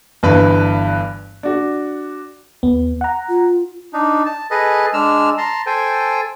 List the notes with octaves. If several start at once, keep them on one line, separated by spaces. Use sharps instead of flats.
G1 G2 E3 B4 B5
D4 F#4
D#2 B3
F#5 A#5
F4
D4 D#4
A5
G#4 A4 B4 D#5
G#3 D4 E6 F6
A5 A#5 C6
A4 C5 G5 G#5